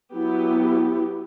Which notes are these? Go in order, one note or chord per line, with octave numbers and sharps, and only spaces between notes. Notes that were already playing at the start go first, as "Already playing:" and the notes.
F#3 B3 E4 G4